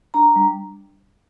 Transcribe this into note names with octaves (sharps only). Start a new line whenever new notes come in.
D4 A#5
G3